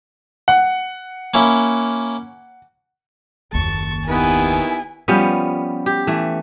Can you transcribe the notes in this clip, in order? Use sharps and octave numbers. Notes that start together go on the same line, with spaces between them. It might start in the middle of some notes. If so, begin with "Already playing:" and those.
F#5
A#3 C#4 E4
F#1 D#2 A5 C#6
D#3 B3 E4 G4 B4 G#5
F3 G3 B3 C#4
G4
E3 A3